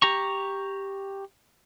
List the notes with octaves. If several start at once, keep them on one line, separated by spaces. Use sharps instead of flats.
G4 A#5 C#6